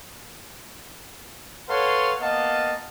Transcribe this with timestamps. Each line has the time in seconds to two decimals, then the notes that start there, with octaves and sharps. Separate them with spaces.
1.69 A4 B4 C#5 F5 F#5 C6
2.21 A#3 B3 D#5 F5 F#5 A5